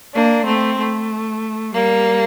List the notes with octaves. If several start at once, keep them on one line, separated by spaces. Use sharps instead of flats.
A#3 D4
A3 C4
A3
G3 A#3